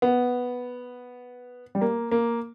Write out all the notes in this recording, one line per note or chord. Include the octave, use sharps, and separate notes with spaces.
B3
G3
A#3
A#3